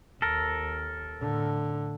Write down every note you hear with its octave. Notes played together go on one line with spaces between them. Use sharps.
D#2 A4 A#4
A2 D3